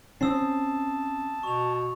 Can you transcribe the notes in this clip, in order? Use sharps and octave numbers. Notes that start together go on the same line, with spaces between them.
C4 C#4 A5 D#6 E6 C7
B2 C#6 F7